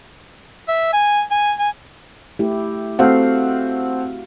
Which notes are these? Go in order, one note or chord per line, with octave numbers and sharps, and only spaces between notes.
E5
G#5
G#5
G#5
A3 E4 G4
A3 C4 F#4 F5 F#5